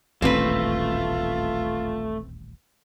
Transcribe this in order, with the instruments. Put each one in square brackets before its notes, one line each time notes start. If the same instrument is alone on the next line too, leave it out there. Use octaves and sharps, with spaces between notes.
[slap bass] D#1 A1 D2 [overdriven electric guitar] A3 [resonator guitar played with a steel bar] C4 B4 [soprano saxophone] F4